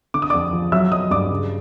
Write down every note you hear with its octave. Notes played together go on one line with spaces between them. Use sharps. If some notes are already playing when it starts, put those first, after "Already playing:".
D3 D6
D#6
F2 D5 D6
F3
F#3 E5 E6
F#3 D#5 D#6
G2 D5 D6
C#3